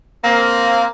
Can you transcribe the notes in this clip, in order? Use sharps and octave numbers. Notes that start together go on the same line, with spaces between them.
A#3 C4